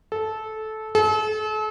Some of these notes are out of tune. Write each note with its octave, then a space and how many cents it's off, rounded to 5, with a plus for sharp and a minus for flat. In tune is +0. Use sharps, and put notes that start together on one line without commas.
A4 -15
A4 -40